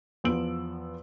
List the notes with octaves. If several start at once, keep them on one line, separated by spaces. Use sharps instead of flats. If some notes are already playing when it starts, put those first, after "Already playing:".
E2 F3 B3 E6 D7 F#7